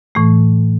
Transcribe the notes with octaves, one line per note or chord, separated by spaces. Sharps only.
A2 E3 A3